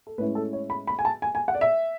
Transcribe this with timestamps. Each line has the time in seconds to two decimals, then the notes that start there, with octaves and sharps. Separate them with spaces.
0.07 A4
0.18 A2 G#3 C#4 E4 B4
0.35 A4
0.53 C#5
0.70 B5
0.87 B5
0.99 G#5
1.05 A5
1.22 G#5
1.35 G#5
1.48 F#5
1.55 D5
1.61 E5